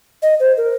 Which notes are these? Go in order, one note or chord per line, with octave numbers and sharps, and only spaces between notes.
D#5
C5
A#4